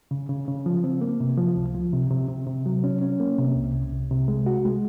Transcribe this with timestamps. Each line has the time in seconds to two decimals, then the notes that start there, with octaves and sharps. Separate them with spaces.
0.11 C#3
0.29 C#3
0.48 C#3
0.66 F3
0.84 C4
1.01 A#3
1.20 C3
1.38 F3
1.56 C#2
1.75 F3
1.93 C3
2.11 C3
2.28 C3
2.47 C3
2.66 F#3
2.84 C#4
3.01 C#4
3.20 A#3
3.38 C3
3.56 C2
3.74 C2
3.92 C2
4.11 C3
4.28 G#3
4.46 F#4
4.65 G#3